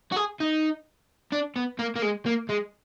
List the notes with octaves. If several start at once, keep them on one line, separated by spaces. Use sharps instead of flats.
F#4
G#4
D#4
D4
B3
A#3
A#3
G#3
A#3
G#3